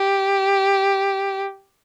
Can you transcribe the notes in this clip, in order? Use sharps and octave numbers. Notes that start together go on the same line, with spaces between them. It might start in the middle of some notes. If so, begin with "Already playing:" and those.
Already playing: G4